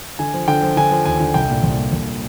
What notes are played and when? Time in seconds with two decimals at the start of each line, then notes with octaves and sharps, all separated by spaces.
0.19 D3 G#5
0.34 F3
0.48 D3 G5
0.63 F3
0.77 D3 G#5
0.91 F3
1.05 D#2 G#5
1.20 D3
1.34 C2 G5
1.50 A#2
1.63 C2
1.79 A#2
1.93 C2